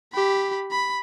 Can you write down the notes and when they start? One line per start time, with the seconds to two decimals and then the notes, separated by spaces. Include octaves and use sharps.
0.13 G4 B5
0.71 B5